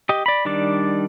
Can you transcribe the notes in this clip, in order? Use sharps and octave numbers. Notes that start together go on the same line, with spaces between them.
G4 D#5
D5 B5
D#3 G3 D4 D5